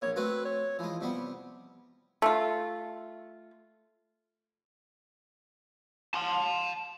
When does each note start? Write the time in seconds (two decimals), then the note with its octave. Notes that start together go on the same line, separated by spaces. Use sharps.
0.02 A#1 C#5
0.16 A3 C4 F#4 B4
0.45 C#5
0.79 E3 F3 G#3
1.01 C3 G3 B3
2.22 A3 F4
6.14 A5 C6